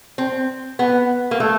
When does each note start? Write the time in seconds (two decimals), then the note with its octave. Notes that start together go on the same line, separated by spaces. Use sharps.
0.18 C4
0.79 B3
1.31 A#3
1.40 A3